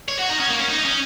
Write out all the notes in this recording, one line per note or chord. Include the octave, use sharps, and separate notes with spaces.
C#5
F#4
D#4
C#4
A#3
C#4
D#4
C#4